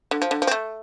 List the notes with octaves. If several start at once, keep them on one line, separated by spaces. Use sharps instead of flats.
D3
F3
D3
F3
C4
A3